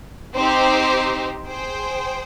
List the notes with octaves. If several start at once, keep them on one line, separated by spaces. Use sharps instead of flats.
C4 D#4 G4 C5
G#4 C5 G5